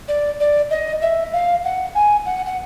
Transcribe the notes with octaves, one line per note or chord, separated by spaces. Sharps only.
D5
D5
D#5
E5
F5
F#5
G#5
F#5
F#5